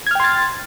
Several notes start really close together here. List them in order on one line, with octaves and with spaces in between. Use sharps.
G#6 F6 G5 C6 A6